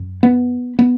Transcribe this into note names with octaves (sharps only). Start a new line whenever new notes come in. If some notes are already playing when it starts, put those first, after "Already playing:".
Already playing: F#2
B3
B3